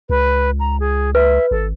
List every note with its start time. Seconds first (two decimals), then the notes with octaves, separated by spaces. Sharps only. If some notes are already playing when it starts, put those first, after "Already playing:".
0.10 C#2 B4
0.60 A#5
0.80 G#4
1.15 B4 E5
1.51 G#1 A4